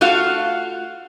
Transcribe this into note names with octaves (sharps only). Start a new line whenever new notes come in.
A3 F4 F#4 F5